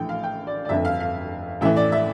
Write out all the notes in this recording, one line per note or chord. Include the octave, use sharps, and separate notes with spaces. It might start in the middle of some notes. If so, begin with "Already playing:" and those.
Already playing: A#1 A2 E3 G5
F5
G5
D5
D5
G1 F2 D3 E5
F5
F5
A1 A2 E3 E5
D5
E5